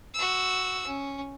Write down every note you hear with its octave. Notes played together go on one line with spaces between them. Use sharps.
F#4 E6
C#4